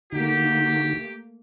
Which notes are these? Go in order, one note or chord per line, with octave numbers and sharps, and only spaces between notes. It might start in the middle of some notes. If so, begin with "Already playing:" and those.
D3 A3 A#3 D#4 F#4 G4